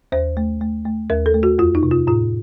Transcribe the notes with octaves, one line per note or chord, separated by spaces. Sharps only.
D#2 C5
A3
A3
A3
D#2 A#4
A4
A3
F#4
F2 F4
D#4
C3
F4
A2 F4